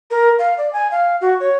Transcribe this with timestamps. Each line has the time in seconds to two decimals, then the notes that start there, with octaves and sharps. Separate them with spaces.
0.11 A#4
0.39 F5
0.58 D5
0.73 G#5
0.91 F5
1.21 F#4
1.40 C#5